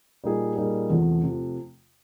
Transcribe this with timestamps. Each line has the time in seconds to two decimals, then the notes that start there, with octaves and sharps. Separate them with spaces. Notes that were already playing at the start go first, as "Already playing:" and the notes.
0.24 A#2 G3 A#3 D#4 G#4
0.56 A#2 G3 A#3 D#4 G#4
0.90 E2 C3 F3 A3
1.22 C3 F3 A3